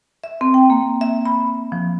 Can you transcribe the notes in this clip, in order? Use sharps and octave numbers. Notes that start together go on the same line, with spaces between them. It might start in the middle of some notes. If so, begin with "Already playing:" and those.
E5
C4
G5
A#3
E5
B5
F3